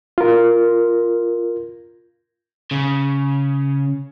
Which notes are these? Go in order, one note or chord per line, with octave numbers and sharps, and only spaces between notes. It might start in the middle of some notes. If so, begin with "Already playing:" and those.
F4 A#4
C#3